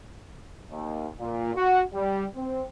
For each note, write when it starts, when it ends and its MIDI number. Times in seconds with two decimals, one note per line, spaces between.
0.71 1.06 39
1.19 1.54 46
1.55 1.81 66
1.94 2.25 55
2.35 2.65 60